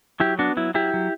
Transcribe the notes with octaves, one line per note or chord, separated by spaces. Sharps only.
F#3 E4 G4
B3 D4 F#4
F#3 E4
F#3 E4 G4
F#3